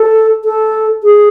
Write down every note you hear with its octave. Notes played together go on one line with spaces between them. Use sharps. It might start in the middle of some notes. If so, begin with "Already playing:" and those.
Already playing: A4
A4
G#4